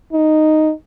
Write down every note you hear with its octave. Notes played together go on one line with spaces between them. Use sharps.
D#4